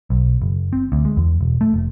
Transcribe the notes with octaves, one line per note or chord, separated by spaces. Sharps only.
B1
F#1
C4
D2
G#3
E2
E1
A3
F1